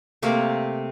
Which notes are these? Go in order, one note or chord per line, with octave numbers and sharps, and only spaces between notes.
C3 A3 A#3